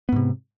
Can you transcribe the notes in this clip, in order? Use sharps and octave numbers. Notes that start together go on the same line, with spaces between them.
G#2 C3 B3